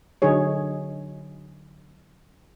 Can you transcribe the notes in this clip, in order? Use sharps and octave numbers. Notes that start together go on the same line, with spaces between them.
D3 F#3 D#4 G#4 C#5